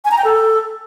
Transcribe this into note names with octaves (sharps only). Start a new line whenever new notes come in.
G#5
A#5
G5
A4